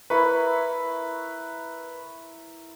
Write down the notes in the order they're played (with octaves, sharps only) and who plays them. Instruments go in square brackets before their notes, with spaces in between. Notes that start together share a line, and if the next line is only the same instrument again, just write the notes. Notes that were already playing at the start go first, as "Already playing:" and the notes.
[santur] E4 A#4 C#5 [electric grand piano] B4 B5